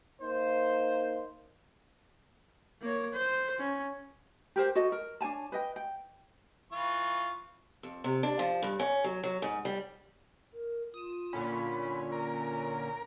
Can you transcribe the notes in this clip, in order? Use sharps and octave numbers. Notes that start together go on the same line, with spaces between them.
A#3 D#4 C5
A#3 C#5
C5
C#4
G4 A#4 C5 G5
F#4 A4 D#5
A#4
D4 C#5 G#5 A5
B4 D#5 G5
G5
E3 F4 C#6
F2
C3
D4
F3
G2
C#4
F#3
F#3
G#2
G3
A#4
F4 D#6 E7
A#2 D3 C#4 B5
A#4